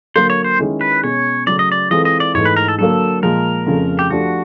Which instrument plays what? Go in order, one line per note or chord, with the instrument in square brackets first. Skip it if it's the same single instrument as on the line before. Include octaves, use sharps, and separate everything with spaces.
[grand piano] D3 F#3 A#3 [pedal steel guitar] C5
[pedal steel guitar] C#5
C5
[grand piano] D#3 G#3 C#4 E4
[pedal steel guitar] B4
[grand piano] B2 G#3 C#4 [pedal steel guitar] C#5
[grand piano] C#3 F#3 A3 [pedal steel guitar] D5
[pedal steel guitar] D#5
D5
[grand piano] E3 G#3 C4 F4 A4 [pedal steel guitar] D#5
[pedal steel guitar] D#5
D5
[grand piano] G#2 E3 A3 [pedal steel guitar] C#5
[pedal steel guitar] B4
A#4
A4
[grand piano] D3 F#3 A#3 [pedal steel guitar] A4
[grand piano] A#2 F3 G#3 [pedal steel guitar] A#4
[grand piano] F2 C#3 F3 A3
[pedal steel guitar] G4
[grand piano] F3 A3 D4 G4 [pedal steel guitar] F#4